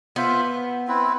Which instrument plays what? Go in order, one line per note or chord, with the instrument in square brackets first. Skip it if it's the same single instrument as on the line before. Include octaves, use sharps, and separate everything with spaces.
[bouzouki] B3 [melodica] F4 C5 E5
[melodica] C4 E4 B4